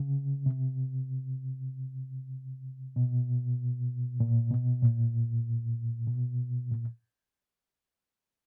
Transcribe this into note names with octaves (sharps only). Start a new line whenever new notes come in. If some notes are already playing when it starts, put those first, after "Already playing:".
Already playing: C#3
C3
B2
A#2
B2
A#2
B2
A#2